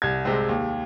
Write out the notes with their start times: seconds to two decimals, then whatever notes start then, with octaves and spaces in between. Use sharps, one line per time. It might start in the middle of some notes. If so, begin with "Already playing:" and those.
0.02 C2 G#6
0.25 C3 G#3 C4
0.49 D#2